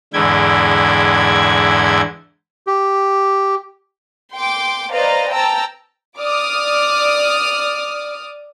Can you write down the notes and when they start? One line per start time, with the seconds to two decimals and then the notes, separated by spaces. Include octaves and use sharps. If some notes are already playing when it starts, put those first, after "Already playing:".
0.13 E2 G#2 D3 E4 G5 G#6
2.67 G4
4.34 G5 C6 D6
4.91 B4 C5 D5 D#5 F5 A#5
5.31 G5 A5 A#5 E6
6.17 D5 D6 D#6 F6